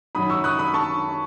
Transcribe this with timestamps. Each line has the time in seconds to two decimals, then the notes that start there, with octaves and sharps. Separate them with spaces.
0.15 F#2 D#3 F#3 B5 D#6
0.30 C#6 E6
0.44 D#6 F#6
0.59 B5 D#6
0.74 A5 C#6